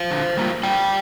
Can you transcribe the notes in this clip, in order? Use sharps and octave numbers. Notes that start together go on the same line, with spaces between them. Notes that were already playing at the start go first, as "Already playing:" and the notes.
Already playing: C5 F5
D3
G3 A#3 F4
D3 D5 G5